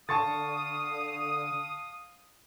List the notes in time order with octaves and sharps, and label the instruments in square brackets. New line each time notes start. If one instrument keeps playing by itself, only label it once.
[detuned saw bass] D3 [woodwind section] F5 D#6 [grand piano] A5 C#6 A6